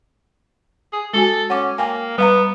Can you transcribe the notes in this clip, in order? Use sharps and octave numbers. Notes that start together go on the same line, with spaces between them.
G#4
G#3 F#4 A4 G#5
C#4 F#5 D6
A#3 G5 G#5
G3 B3 F5 A#5